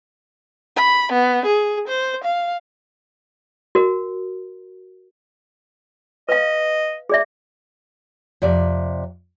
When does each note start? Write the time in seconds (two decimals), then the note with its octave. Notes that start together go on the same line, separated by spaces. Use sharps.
0.76 B5
1.12 B3
1.46 G#4
1.88 C5
2.24 F5
3.75 F#4 A#4
6.29 B4 D#5 F5
7.09 G#4 D5 E5
8.42 F2 C3 D5